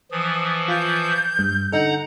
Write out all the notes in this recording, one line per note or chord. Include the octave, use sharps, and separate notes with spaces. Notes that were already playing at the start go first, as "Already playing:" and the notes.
E3 F3 D#6
F4 G6
G2
D3 D#4 A4 F#5 A#5